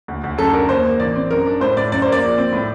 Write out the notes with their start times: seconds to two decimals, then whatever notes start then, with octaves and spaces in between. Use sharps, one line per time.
0.08 D2
0.24 D2
0.38 F#2 A4
0.53 D4 A#4
0.69 D#2 C5
0.84 A#3
1.00 A1 D5
1.16 C4
1.31 F#2 A#4
1.46 D4
1.61 A2 C5
1.77 A2 D5
1.92 F#2 D5
2.02 C5
2.07 A#3
2.12 D5
2.22 A#1
2.38 C4
2.53 A2